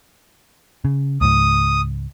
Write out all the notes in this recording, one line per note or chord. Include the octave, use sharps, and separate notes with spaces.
C#3
C#2 G#2 D#6